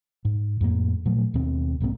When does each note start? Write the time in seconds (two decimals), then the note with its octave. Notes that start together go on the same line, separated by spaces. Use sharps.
0.25 G#2
0.61 F2 A2 A#3
1.06 A#2 F3 F#3 A3
1.34 D#2 B2 C4
1.80 B1 G#2 A#3 C4